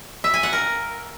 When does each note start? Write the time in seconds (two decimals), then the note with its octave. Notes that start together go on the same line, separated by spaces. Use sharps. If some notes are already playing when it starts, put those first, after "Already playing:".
0.24 E5
0.34 G#5
0.43 F#5
0.53 A#4